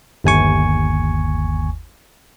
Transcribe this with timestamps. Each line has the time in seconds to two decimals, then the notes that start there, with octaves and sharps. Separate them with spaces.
0.24 G1 D#2 G#5 C#6